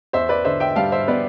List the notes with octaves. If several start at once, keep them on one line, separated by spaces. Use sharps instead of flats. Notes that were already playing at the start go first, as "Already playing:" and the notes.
E2 C5 E5
B4 D5
D3 C5 E5
E5 G5
G3 F5 A5
C5 E5
B3 B4 D5